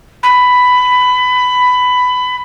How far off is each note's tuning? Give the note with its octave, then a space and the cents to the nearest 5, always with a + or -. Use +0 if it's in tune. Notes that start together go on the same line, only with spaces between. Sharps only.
B5 +15